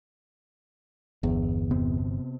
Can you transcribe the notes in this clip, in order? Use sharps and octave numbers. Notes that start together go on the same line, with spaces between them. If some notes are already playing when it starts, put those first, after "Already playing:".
G1 E2
C3 B3 C4